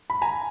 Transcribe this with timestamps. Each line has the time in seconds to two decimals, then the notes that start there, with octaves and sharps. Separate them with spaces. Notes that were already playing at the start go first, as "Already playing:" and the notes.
0.10 B5
0.22 G#5 A#5